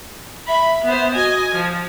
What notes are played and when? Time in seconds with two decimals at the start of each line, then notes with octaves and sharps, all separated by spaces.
0.48 E5 B5
0.85 B3 C5
1.15 F#4 D#5 G#5
1.55 F3